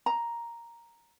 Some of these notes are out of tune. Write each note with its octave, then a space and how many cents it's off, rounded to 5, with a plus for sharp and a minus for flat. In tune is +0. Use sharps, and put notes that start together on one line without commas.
A#5 +5